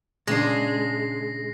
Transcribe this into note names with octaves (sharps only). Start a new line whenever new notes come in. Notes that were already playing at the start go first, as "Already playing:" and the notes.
A#2 C#3 G#3 D4 A#6 C7